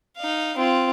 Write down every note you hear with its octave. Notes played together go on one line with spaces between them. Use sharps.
D#4 F5
C4 F4